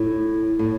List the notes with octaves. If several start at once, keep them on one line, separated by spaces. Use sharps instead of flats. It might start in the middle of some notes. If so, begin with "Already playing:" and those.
Already playing: A2
A2